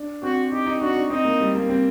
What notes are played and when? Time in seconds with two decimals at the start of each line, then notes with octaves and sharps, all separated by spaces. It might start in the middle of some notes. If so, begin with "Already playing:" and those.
Already playing: D4
0.23 C4 F#4
0.52 D#4 G4
0.67 D#4
0.81 D4 F#4
0.97 D4
1.10 C4 D#4
1.25 A#3
1.40 G3
1.55 A#3
1.69 C4